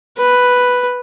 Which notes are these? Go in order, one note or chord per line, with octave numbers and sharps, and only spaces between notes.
B4